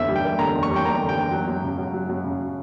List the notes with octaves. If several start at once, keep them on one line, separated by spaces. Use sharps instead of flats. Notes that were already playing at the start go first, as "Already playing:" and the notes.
Already playing: E2 D3 A#3 E5
G3
G5
A#3
D3 A#5
E2
C#6
G3
G5
A#3 A#5
D3
G5
E2
F#3
F#2
C#3
F#2
F#3
F#2
C#3